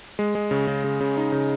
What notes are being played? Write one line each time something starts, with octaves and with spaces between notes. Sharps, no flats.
G#3
G#3
C#3
C#3
C#3
C#3
D#4
C#3